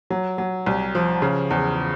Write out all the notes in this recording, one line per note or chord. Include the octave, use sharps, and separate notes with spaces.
F#3
F#3
C2
F3
C#3
E2